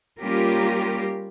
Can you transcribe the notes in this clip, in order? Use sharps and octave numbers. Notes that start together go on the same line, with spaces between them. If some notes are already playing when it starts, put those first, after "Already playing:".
G3 A#3 C#4 F4 G4 A#4